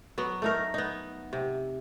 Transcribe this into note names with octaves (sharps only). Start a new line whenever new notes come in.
F#3 B3
A3 D#4 A#4
B3 D#4
C3